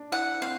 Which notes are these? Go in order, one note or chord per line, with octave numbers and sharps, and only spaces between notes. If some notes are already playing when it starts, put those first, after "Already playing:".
Already playing: D4
E4 F#5
C4 F5